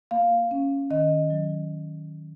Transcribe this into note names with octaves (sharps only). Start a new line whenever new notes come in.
A#3 F5
C#4
D#3 D#5
F#3